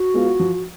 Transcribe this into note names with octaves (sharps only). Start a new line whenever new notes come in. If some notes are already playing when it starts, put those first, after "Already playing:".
Already playing: F#4
G#3 B3 F4
F3